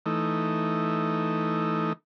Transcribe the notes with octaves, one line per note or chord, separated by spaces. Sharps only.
E3 A3 D#4